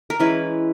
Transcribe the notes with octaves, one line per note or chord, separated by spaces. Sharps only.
A#4
E3 G#3 C#4 E4 B4